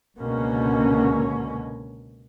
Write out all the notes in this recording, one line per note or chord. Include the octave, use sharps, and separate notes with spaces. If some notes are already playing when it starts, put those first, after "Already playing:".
C#2 B2 D3 A#3 C#4